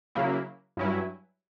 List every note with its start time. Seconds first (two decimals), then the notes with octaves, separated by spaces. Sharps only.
0.15 C#3 F#3 A#3 E4
0.77 G2 F#3 C#4 E4